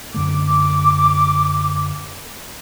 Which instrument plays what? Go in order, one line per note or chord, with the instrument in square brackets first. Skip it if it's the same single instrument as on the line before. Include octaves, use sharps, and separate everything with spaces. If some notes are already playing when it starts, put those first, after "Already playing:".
[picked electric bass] F#2 D3 A3 [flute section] D6